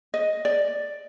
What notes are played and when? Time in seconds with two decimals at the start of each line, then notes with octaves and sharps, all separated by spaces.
0.14 D#5
0.45 D5